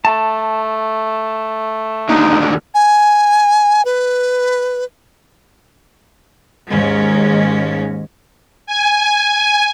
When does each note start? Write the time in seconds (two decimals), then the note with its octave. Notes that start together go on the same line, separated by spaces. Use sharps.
0.05 A3 A5
2.09 D#2 D3 D#4
2.74 G#5
3.85 B4
6.71 D#2 G#2 G#3 C#4
8.67 G#5